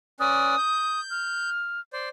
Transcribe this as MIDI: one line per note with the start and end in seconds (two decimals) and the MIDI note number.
0.20 0.55 61
0.20 0.55 71
0.20 0.55 74
0.20 1.00 87
0.58 1.50 91
1.11 1.80 89
1.93 2.09 72
1.93 2.09 74